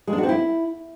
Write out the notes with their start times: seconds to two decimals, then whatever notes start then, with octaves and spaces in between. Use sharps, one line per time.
0.07 G#3
0.13 D4
0.18 F#4
0.23 C4
0.29 E4